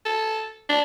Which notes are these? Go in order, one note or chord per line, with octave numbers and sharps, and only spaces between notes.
A4
D4